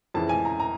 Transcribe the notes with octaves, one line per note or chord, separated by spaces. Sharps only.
F2 C#3 E3 A5
G#5
A#5
A#5